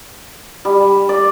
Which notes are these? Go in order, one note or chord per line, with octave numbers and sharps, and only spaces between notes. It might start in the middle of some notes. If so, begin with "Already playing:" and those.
G3
D5